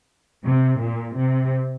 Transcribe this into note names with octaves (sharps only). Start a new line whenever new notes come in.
C3
A#2
C3